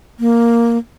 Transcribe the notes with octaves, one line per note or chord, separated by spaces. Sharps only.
A#3